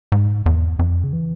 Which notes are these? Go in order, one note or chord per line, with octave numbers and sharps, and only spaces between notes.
G#2
E2
F2
C#3
E3